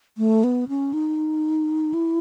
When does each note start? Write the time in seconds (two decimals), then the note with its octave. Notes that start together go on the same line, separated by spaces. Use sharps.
0.18 A3
0.44 B3
0.68 C#4
0.93 D#4
1.94 E4